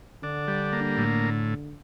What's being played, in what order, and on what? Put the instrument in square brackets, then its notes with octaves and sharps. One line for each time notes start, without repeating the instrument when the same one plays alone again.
[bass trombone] D3 [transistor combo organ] D4
[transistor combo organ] G3
A#3
A2